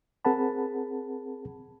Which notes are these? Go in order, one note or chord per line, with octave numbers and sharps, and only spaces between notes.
C4 G#4 A#4 F#5 A5 B5